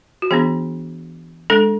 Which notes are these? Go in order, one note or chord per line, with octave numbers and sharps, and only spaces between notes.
F#4
E3 B3 D4 G#4
G#3 D4 A4